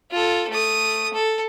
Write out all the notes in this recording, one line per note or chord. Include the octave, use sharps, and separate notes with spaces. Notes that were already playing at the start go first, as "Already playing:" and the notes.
F4 A4
A3 D#6
A4